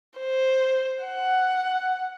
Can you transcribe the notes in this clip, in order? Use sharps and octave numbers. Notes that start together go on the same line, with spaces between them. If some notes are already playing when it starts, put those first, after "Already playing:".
C5
F#5